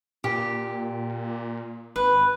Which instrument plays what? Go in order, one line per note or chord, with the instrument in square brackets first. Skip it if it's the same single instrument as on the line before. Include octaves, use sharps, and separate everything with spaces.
[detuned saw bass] A#2 [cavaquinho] G4
[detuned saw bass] G#1 [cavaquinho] B4